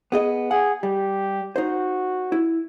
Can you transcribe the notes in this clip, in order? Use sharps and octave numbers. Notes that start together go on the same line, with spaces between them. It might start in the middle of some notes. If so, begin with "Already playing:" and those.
B3 G#4 D#5
G#4 F#5
G3 G4
D#4 F#4 C5
E4